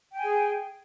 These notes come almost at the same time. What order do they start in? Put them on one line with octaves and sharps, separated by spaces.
G5 G#5 G#4